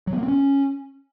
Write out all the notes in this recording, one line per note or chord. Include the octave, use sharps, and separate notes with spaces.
F#3
B3
A#3
C4
C#4